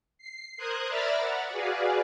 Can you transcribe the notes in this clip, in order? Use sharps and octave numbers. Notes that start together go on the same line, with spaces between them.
C7
A#4 C5 D#6 F#6 G#6
D5 E5 A#5 B5 F6 A6
F#5
F#4 G#4 B4 D5 F5 G#5